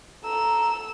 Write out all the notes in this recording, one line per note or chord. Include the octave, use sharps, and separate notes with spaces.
A4 A#5 E6